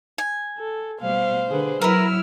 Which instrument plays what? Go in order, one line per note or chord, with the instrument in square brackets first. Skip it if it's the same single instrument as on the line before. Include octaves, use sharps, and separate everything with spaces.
[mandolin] G#5
[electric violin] A4
[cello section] B2 G3 A3 [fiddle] C5 [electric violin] F5
[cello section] D3 [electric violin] G#4 B4
[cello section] F#3 E4 [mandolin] A#4 B4 [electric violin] E6 F6